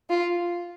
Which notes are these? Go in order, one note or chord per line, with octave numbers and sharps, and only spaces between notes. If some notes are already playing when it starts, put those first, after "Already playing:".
F4